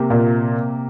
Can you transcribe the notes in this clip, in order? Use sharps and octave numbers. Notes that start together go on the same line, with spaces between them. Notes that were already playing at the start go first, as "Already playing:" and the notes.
Already playing: C3 A#3 G4
A#2